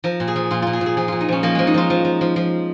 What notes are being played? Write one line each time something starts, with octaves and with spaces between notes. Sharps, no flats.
F3 A#4
A#2
G#4
F3
A#2 F4
A#2 F4
G#4
A#2
G#4
F3 G#4
A#2 F4
D#4
F3 C#4
F3 A#3
F3 G#3
D#4
F3 F4
F3
F3
F3
F3